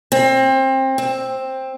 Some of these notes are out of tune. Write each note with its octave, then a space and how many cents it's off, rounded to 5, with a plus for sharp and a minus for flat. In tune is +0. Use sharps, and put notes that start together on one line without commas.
C4 +25
C4 +10